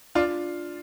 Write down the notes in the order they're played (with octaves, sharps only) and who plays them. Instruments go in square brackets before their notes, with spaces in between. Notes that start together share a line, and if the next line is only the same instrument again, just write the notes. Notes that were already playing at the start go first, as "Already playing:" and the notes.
[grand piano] D4 F4